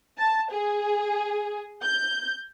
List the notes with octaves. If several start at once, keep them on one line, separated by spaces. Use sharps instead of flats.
A5
G#4
G6